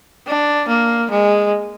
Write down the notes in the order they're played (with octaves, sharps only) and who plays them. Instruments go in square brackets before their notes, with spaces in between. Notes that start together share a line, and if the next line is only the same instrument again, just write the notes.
[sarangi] D4
A#3
G#3